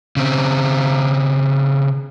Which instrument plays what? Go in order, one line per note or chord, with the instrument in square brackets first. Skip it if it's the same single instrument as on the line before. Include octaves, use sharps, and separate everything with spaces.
[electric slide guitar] C#3 C4